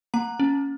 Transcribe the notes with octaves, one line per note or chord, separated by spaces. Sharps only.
A#3 A#5
C#4